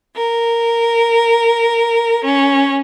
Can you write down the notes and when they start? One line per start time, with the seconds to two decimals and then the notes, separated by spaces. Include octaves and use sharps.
0.17 A#4
2.26 C#4